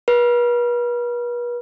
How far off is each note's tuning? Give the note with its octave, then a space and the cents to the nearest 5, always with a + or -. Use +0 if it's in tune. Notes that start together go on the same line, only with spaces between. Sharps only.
B4 -40